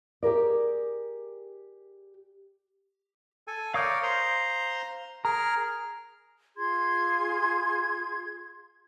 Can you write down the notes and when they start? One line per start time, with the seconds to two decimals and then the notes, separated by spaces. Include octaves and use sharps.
0.23 G4 G#4 A#4 D5
3.47 A4 G#5
3.74 A#4 C#5 D5 F5 D#6 G6
4.03 C5 A#5 C6
5.25 G#4 A#4 A#5 F6
6.56 F4 G#4 C6 G#6